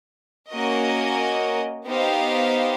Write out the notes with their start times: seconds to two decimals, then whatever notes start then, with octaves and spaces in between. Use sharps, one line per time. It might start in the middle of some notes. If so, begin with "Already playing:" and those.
0.51 A#3 C#4 F#4 A#4 D#5
1.86 B3 D#4 G4 C5 F5